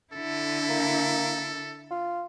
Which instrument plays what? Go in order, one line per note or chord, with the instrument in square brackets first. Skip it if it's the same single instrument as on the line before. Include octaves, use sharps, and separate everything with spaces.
[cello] D3 E4 [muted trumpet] A4
[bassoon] A#3
F4